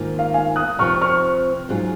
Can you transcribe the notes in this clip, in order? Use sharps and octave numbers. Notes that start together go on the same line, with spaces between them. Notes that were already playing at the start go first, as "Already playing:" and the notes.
Already playing: G#2 D#3 A#3 F4
F5
F5 G#5
D#6 F#6
C3 F3 C4 C#6 F6
C#6 F6
G#2 F#3 C#4 F4 G#4